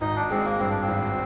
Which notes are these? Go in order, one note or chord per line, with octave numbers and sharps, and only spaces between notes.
G#1 D#4
D4
G#3 C4
A#3
G2 C4
D4
C4
G#1